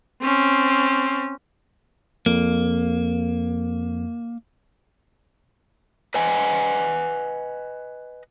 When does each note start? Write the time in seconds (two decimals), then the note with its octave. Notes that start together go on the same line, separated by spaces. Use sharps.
0.22 C4 C#4
2.26 F2 A#3
6.14 B4 D#5 F#5 G#5